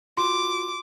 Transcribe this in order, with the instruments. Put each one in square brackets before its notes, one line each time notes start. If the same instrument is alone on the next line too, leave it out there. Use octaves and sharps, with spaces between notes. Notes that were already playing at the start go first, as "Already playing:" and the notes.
[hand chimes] F4 F#4 [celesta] C6 [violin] D6